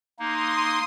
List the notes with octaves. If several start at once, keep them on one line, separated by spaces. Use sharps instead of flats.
A#3 D#4 C6 D#6